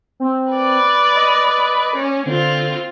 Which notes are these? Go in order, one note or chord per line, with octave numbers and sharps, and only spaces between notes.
C4
B4 D5
D#5
C#4
D3 C4 F4